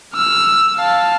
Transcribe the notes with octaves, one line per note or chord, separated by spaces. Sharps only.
E6 F6
F5 A5